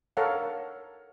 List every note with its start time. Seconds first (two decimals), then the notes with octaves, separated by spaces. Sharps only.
0.17 A4 A#4 C#5 F5 F#5